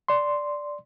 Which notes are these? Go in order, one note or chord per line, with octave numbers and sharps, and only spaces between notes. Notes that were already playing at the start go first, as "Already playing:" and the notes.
D5 C6